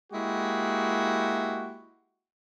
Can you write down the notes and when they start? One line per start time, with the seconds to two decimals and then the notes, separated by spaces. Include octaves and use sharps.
0.12 G#3 A#3 E4 F#4 G4